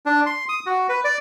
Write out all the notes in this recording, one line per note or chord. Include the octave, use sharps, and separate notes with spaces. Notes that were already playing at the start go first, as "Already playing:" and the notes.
D4
C6
D#6
F#4
B4
D5